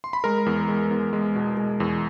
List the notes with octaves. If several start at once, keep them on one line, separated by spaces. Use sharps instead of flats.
C6
B5
G#3 A#4 A#5
E2
G#3
E2
G#3
B2
G#3
E2